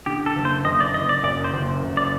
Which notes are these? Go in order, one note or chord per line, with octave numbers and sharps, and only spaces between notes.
D3 G4
A4
F#1
C5
F#1 D#5
D5
F#1 D#5
D5
F#2 D5
C5
F#1
F#1
D5